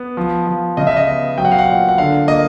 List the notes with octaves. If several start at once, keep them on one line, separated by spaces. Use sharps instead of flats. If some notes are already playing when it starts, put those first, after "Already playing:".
Already playing: B3
F3
F3
C#3 D#5
E5
D#5
B3
F#3 G5
F#5
F5
F#5
A#2
F#5
D3 F5
A#3 D#5